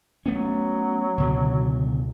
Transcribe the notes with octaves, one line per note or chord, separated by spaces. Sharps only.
F#3 A3 B3 C#4
C#2 B2 D3